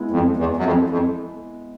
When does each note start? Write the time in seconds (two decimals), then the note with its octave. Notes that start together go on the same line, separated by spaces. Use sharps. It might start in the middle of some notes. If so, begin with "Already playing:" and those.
Already playing: G#3 B3 E4
0.11 F2
0.37 E2
0.57 F#2
0.64 F2
0.90 F2